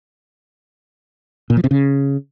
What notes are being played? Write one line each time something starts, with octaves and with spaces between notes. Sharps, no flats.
A#2
F3
C3
C#3